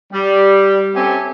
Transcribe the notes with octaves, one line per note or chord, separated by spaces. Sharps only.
G3
C4 C#4 G4 A4 E5 G#5